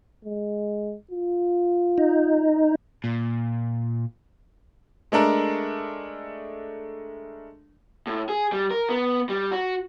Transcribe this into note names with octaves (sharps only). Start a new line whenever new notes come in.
G#3
F4
D#4
A#2
G#3 A3 D4 A#4
A2
G#4
G3
A#4
B3
G3
F#4